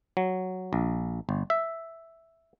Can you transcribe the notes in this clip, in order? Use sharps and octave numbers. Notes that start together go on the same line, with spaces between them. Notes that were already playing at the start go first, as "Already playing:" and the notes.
F#3
A#1
G1
E5